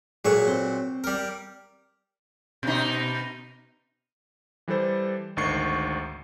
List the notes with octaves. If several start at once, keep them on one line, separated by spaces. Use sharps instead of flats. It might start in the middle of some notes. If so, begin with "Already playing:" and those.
A#2 F#3 G#4 A4 C#5 C#6
C4
G3 A#4
B2 D#4
E3 G3 G4 A4 C5
G#1 D2 D#3 C#6 C7